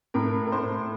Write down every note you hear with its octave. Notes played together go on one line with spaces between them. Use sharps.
A2 A#4
A#4
A2 C5